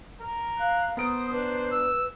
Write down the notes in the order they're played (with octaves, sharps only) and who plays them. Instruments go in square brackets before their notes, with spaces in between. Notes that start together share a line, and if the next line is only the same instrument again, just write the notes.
[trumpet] A#4
[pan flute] F5 [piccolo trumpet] F#6
[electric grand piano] B3 A#4 D7 [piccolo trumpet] C5 [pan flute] D#6
[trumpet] D4 [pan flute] B4
[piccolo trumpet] E6